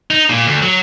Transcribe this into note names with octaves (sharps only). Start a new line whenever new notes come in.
D#4
A#2
D2
F#3